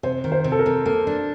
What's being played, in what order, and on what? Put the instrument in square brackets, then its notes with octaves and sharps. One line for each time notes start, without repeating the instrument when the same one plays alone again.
[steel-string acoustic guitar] C3 [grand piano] C5
[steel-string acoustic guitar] D#3
[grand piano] C5
[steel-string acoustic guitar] C3
[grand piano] A4
A#4
[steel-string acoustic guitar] C3
[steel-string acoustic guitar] A#3 [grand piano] A4
[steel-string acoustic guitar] D4